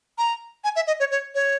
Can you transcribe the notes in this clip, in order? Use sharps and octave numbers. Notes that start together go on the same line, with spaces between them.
A#5
G#5
E5
D#5
C#5
C#5
C#5